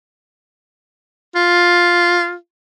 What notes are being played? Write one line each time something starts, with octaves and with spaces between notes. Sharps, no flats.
F4